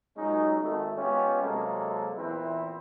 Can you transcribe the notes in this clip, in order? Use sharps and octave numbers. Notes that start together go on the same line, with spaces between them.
A#2 F#3 G#3 C#4 D#4
G#1 A3
G#3 B3 C#4 F4 G4
C3 F#3 G#3 A#3 A4
E2 A#2 E3 C4 E4 B4